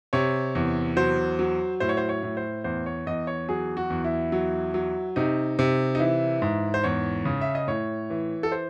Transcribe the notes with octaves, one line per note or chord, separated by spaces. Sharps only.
C3 C#5
E2
F#3 C5
F#3
A2 C5
C#5
C5
C#5
A2
C5
E2 C5
C#5
E2 D#5
C#5
F#3 G#4
F#4
E2
E4
F#3
F#3
C3 D#4
C3
D#4
E3 E4
G#2
C5
E2 C#5
C#3
E5
D#5
A2 C#5
E3
A4
C5